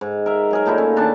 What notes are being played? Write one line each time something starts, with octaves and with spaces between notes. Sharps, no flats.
G#2
A#4 E5
F#3 G#4 A#4
A#2 A3 D#4 E4
C#4
D#3 D4 D#4 A5